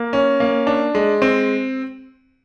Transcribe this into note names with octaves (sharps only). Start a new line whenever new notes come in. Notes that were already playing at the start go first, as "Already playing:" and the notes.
Already playing: A#3
C#4
A#3
D4
G#3
C4